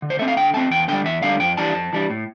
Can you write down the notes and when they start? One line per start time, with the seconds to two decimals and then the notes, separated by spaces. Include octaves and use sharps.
0.02 D3
0.10 C5
0.19 A3 C4 E5
0.28 F5
0.37 D3 G5
0.54 A3 C4 A5
0.71 E2 G5
0.88 D3 G3 G5
1.05 E2 E5
1.22 D3 G3 F5
1.40 F2 G5
1.57 E3 G3 D4 A5
1.75 F2
1.93 E3 G3 D4
2.10 A2